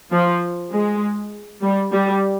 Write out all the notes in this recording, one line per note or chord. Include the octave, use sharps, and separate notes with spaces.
F3
G#3
G3
G3